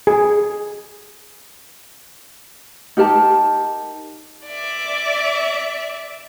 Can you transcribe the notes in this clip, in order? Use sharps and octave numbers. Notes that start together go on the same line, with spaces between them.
G#4
D#4 G4 A#4 A5
D5 E5